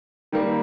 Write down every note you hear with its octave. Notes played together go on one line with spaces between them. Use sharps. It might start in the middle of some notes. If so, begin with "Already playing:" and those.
D#3 G3 A#3